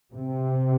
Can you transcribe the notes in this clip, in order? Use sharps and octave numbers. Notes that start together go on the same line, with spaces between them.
C3